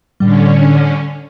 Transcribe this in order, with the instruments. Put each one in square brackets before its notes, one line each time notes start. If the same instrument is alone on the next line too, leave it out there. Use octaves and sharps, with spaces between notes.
[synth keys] A2 G3 [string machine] D3 C#4